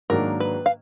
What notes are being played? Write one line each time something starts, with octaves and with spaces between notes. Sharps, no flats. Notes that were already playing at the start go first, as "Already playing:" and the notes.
G#2 D#3 F#3 A#3 D4 A#4
B4
F5